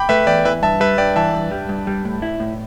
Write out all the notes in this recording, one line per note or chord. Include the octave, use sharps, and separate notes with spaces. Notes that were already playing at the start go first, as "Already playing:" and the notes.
Already playing: G5 B5 D6
A3 B4 E5
E2 D5 G5
E3 B4 E5
G2 E5 A5
G3 B4 E5
G2 D5 G5
E3 E5 A5
G2
G3
G2
G3
A2
E4
A2